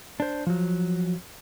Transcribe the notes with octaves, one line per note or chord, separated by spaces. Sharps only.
D4 C5
F3 F#3